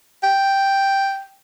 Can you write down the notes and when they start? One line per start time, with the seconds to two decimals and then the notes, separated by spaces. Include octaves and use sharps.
0.23 G5